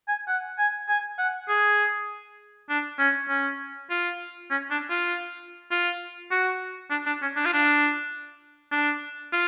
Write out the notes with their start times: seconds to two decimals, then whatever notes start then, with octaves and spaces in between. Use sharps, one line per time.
0.08 G#5
0.28 F#5
0.58 G#5
0.88 G#5
1.18 F#5
1.48 G#4
2.69 D4
2.99 C#4
3.29 C#4
3.90 F4
4.51 C#4
4.71 D4
4.90 F4
5.71 F4
6.31 F#4
6.91 D4
7.06 D4
7.22 C#4
7.36 D4
7.45 F4
7.54 D4
8.71 D4
9.32 F4